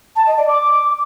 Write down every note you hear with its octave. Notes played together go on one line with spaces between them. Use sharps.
A5
D#5
D5
D6